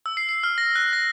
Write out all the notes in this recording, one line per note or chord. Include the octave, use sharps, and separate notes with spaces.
E6
C7
C7
F6
A#6
F#6
A#6